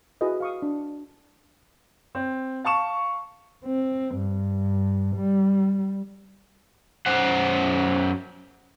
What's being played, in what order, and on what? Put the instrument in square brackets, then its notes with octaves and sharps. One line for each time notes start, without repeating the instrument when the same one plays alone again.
[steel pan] E4 F#4 G#4 B4 D#5
F5 C#6 D#6
D4
[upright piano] C4
F5 A5 C#6 E7
[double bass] C4
G2
G3
[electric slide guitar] F#2 C5 F#5